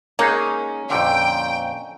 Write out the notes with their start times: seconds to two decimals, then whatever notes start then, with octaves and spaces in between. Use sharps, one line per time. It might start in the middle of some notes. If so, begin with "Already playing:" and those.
0.19 G#3 A#3 C#4 D#4 G#4
0.90 F2 A#2 D3 G5